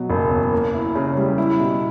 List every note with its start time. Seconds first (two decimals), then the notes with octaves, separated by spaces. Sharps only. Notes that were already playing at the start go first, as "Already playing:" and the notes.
Already playing: B2 F#3
0.10 F#1
0.31 E2
0.53 A#3
0.74 E4
0.95 C#3
1.16 G3
1.38 E4
1.59 B2